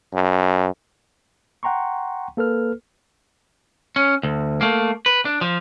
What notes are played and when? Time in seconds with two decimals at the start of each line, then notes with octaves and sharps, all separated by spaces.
0.14 F#2
1.63 F#5 G5 A#5 C6 C#6
2.37 A#3 A4 B4 F6
3.96 C#4
4.23 D2
4.61 A3 A#3
5.06 B4
5.25 D4
5.41 F3